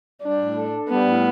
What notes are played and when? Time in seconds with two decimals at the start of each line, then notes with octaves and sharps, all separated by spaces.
0.22 G3 D4
0.40 A2
0.57 A4
0.73 D4
0.89 G3 B3
1.07 A2